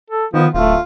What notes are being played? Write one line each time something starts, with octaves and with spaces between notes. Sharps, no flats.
A4
D#3 F3 B3
D1 A3 F4